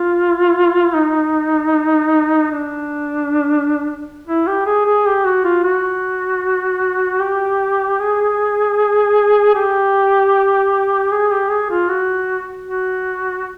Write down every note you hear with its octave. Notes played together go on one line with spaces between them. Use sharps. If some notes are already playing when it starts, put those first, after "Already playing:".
Already playing: F4
D#4
D4
E4
G4
G#4
G#4
G4
F#4
F4
F#4
G4
G#4
G4
G#4
G4
G#4
F4
F#4
F#4